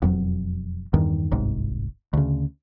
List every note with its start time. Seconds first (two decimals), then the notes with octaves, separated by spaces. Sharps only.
0.02 E1 F2 F#3
0.94 E2 G2 D#3
1.31 D1 G1 C2 G#2
2.13 D2 C#3